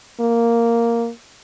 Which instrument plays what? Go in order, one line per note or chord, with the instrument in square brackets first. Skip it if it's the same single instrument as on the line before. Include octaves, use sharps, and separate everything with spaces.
[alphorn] A#3